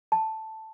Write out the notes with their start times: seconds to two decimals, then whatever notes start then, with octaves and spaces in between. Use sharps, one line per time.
0.12 A5